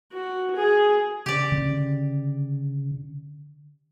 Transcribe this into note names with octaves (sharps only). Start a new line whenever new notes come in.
F#4
G#4
C#3 G4 D5
D3 C#4